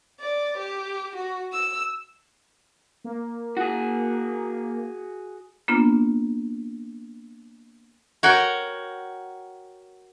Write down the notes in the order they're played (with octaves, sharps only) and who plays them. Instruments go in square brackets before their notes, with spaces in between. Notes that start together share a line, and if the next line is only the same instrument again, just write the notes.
[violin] D5
G4
F#4
E6
[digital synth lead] A#3
[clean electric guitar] F#4 G#4
[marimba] A#3 B3 D4 F4
[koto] F#4 A#4 C#5 F#5 G5